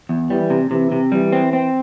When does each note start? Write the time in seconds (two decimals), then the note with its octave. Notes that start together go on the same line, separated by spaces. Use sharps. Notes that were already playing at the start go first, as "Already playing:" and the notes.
0.09 E2
0.30 E3 G3
0.50 C3
0.71 C3 E3
0.92 C3
1.12 E3 G3
1.32 C4
1.53 C4